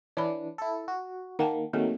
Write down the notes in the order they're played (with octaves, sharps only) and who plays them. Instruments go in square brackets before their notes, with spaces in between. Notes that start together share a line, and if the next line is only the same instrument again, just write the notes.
[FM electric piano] E3 D4 [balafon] C#5 B5
[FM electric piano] E4 A4
F#4
[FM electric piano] D#3 A#3 [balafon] F#5 G5 A5
[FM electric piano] D#3 F#3 A3 [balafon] A#3 C4 G#4